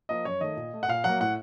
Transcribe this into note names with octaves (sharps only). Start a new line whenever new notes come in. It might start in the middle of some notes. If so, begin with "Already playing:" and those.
F3 A#3 D#5
F#2 C#5
D#3 A3 D#5
A#2
A3
F#5
A#2 F5
F#3 A#3 F#5
A2 F#5